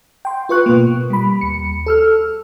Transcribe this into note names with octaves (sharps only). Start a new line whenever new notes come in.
G5 C6
F4 B4 C#6 F#6
B2 A#3
G3 B5
D#2 C#7
A4 E6 F6